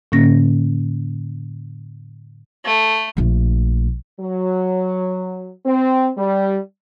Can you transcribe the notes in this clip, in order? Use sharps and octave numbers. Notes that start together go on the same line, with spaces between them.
A2 D3 A#3 C#4 A#6
A3
A#1 A3
F#3
C4
G3